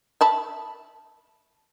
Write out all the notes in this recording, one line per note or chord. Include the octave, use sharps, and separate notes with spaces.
E5 A5 B5